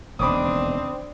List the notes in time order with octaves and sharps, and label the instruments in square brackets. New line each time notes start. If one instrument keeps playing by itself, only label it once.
[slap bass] E1 D#2 C#3 [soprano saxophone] C4 [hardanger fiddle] D4 [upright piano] B5 D6 D#6